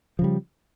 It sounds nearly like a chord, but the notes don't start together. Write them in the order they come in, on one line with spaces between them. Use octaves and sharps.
F3 C#3 G3